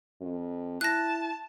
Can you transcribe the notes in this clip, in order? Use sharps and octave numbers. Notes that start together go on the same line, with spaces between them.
F2
E4 A5 F#6 A#6